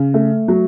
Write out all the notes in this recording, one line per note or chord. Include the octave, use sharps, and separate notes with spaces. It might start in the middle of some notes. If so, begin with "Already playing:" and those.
Already playing: C#3
A3
F#3